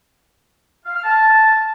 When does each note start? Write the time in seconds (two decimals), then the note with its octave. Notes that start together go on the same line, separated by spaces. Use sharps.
0.85 F5
0.94 F6
1.04 A5